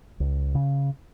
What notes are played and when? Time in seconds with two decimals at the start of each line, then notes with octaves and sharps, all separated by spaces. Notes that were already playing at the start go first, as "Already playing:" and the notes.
0.20 C#2
0.55 C#3